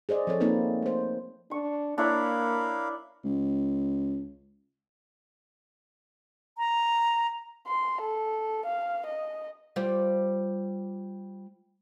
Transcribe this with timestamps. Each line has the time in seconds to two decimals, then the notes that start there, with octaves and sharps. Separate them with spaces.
0.09 G#4 C5 D5 D#5
0.27 F3 C4 A4 C#5
0.40 A#3 C4 D#4 A#4 B4
0.82 A3 C5
1.51 D4 C#6
1.98 A#3 D4 E4 A#4 C#5 F5 B5
3.24 C#2
6.58 A#5
7.67 C6
8.01 A4
8.65 F5
9.06 D#5
9.76 G3 F4 C5